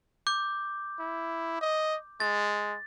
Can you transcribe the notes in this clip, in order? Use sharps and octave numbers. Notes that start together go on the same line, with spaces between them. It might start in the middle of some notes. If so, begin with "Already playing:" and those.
D6 G6
E4
D#5
G#3 A6